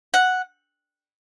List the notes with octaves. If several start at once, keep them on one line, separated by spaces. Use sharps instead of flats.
F#5